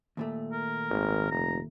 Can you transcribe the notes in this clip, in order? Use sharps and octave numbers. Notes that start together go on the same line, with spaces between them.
D#2 A#2 A3
A#4
G#1
F1 A#5